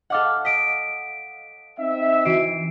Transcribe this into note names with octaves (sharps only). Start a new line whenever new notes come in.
A4 D#5 F5 F#5 D6 F6
D#5 B6 D7
C4 D#4 E5
E3 F#4 C7 D7